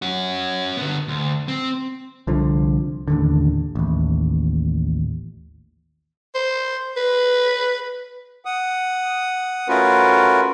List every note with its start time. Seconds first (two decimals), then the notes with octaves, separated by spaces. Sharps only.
0.02 C#4 F#4
0.77 D3 B3
1.08 D2
1.48 C4
2.27 C2 D3 F3
3.08 A1 D#2 D3
3.75 A1 D#2
6.35 C5
6.97 B4
8.45 F#5 D#6
9.68 A3 C#4 F4 F#4 A#4 B4